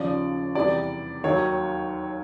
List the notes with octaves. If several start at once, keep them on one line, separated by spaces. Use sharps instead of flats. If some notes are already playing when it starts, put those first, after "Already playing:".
Already playing: D#2 C#3 F3 D5
E2 C3 E3 G3 D5
D#2 D#3 F#3 C#5